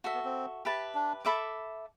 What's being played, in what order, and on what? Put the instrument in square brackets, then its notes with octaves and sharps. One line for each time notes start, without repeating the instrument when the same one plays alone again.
[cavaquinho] F#4 A4 E5
[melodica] B3
C4
[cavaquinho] G4 B4 E5 A5
[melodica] D4
[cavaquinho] A4 E5 B5 D6